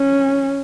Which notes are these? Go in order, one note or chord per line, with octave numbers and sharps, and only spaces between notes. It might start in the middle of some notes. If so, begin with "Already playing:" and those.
Already playing: C#4